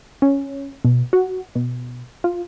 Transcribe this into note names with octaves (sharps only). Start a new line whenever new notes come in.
C#4
B2
F#4
B2
F4